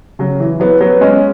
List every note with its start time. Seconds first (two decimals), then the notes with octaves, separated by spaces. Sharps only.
0.19 C#3 F#3
0.40 E3
0.60 F#3 B3
0.81 F#3 B3
1.01 G#3 C#4